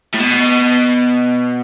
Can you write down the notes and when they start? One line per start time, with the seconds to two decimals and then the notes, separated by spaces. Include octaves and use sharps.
0.14 A2
0.20 B2